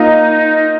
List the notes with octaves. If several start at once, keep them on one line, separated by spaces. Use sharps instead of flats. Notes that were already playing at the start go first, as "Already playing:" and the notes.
Already playing: A#3 D#4 F4 D#5